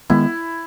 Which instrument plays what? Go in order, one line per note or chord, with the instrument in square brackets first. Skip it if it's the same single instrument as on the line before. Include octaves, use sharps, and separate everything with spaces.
[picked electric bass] D#3 G#3 B3 [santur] E4